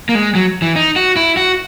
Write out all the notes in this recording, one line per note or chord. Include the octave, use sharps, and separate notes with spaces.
A#3
G#3
F#3
E3
D#4
F#4
E4
F#4